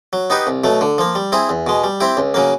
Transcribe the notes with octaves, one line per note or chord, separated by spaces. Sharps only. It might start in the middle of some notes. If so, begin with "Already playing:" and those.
F#3
B3 D#4 G4 B4
C2
B2 F#3 A3
D3
F3 A#3
G3
C4 E4 G#4
E2
B2 G#3
G3
C4 E4 G4
C#2
C#3 F#3 A#3